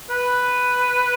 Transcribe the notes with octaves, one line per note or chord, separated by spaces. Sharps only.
B4